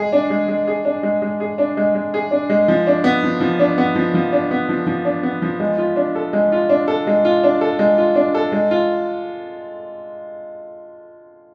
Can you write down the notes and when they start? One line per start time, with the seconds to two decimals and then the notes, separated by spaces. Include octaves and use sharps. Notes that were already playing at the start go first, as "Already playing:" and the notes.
Already playing: G#3 G#4
0.12 D4
0.30 G#3
0.48 G#3
0.67 G#4
0.85 D4
1.03 G#3
1.22 G#3
1.40 G#4
1.58 D4
1.77 G#3
1.95 G#3
2.14 G#4
2.31 D4
2.50 G#3
2.68 F3
2.87 D4
3.04 B3
3.23 F3
3.41 F3
3.59 D4
3.78 B3
3.95 F3
4.14 F3
4.32 D4
4.51 B3
4.69 F3
4.87 F3
5.05 D4
5.23 B3
5.42 F3
5.60 G#3
5.78 F4
5.96 D4
6.15 A4
6.33 G#3
6.52 F4
6.69 D4
6.88 A4
7.07 G#3
7.25 F4
7.44 D4
7.61 A4
7.79 G#3
7.98 F4
8.15 D4
8.34 A4
8.52 G#3
8.71 F4